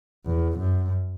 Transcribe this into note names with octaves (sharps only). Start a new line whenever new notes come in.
E2
F#2